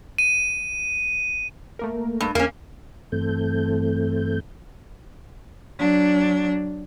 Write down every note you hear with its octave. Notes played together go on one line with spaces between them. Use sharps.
D#7
A3 A#3 A#4
G2
E2 A#3 C#4 F5
G2 E3 A3 C4 A4 G6
F#3 D4